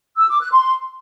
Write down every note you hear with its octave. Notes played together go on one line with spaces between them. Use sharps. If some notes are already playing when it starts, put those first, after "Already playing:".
E6
D6
F#6
C6